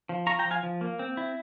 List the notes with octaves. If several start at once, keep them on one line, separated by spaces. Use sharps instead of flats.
F3
F4 A#5 C#6
G5 A#5
F3
F5 G#5
F3
A#3
C4
E4